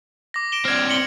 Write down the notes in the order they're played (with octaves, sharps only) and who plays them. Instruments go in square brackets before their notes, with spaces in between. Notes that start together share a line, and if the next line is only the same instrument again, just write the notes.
[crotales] D6 A#6
D7 E7 G7
[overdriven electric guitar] C4 D4 [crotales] F6 G#6
[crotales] C#7 F#7 G7